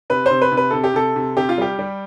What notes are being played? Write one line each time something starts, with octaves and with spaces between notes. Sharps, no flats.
C3 B4
C3 C5
B4
C3
B4
C3 A4
G4
C3 A4
C3
C3 G4
F4
G3 G4
G3